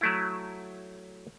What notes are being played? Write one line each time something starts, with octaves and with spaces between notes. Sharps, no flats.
F#3 A3 E4